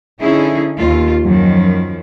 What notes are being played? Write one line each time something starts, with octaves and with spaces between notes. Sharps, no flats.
D3 C#4 D#4 E4 G#4
D#2 F4
F#2 D#3 F3